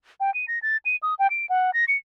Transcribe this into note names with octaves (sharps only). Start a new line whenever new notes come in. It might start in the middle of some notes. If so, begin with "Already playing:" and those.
G5
D#7
A#6
A6
D#7
D#6
G5
D7
F#5
A#6
C#7